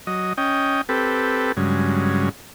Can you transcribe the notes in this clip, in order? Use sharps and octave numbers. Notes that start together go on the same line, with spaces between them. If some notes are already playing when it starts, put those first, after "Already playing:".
F#3 D#5
C#4 D#5 G5
C4 G4 A4 B4
G2 C#3 F#3 G#3